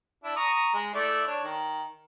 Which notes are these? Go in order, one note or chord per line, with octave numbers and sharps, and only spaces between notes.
D4 E4
A#5 C#6 D#6
G#3
A3 E4 D5
D4 C#5
D#3